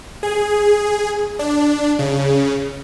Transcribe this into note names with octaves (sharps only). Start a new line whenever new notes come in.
G#4
D4
C#3